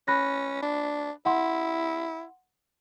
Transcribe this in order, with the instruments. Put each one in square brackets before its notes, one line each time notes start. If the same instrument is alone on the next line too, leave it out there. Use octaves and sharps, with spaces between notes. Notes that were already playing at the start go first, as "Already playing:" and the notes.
[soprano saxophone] C#4 [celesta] B5 F#6 A#6
[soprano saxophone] D4
[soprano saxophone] E4 [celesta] F#5 C6